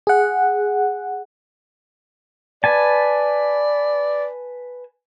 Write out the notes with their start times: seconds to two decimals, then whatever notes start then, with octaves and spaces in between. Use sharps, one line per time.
0.07 G#4 F#5
2.64 B4 D5 G#5 A5